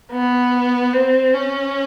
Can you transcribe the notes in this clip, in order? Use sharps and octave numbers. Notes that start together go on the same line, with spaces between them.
B3
C4
C#4